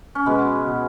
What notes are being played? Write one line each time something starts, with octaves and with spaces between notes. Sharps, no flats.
C#4
B2 G#3 B3
B2